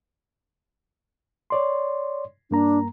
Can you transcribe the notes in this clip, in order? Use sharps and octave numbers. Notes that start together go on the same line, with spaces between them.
C#5 D5 C6
G2 A#3 D4 A#5